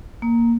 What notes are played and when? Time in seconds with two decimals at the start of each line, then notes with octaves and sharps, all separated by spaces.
0.22 A#3